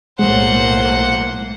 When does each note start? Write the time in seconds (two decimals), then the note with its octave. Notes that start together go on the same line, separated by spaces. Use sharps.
0.19 B1 A2 G#3 A#3 C5 F#5